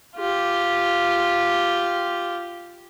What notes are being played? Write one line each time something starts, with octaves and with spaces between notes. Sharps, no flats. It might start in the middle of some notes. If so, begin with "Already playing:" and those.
F4 G4